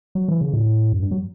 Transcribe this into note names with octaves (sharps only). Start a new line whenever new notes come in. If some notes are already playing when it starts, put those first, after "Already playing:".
F#3
E3
C#3
A2
F#2
G2
F#3